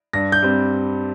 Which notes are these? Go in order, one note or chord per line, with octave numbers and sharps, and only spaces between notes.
G2 A#6
G6
G3 C4